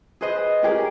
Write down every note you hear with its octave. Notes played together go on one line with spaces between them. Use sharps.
G#4 B4 C5 D#5
C#4 G4 G#4 A#4